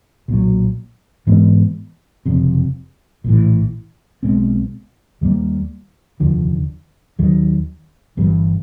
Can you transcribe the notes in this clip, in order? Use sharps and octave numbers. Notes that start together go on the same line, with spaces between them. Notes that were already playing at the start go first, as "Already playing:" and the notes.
B1 A#2 F#3
G#2 E3 G#3 B3
F#1 F2 C3
A#1 A2 E3
B1 B2 G#3 C4
D#2 D#3 G3 A#3
F1 D#2 D3 F3
D#2 D#3 F#3
G1 G2 E3 G3